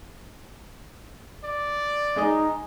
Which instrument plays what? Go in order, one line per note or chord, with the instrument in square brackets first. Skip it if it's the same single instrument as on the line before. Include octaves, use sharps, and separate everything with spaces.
[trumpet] D5
[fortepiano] G#3 G#4 D#5 [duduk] D#4